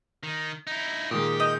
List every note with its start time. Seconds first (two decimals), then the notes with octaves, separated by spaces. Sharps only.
0.23 D#3
0.67 D#4 E4
1.11 A#2 D#3 G#3 G4 D#6
1.40 D#5 G6